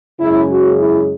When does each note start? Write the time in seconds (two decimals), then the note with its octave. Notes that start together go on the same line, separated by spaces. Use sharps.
0.19 F#2 C#3 G#3 E4
0.49 F#4
0.78 E4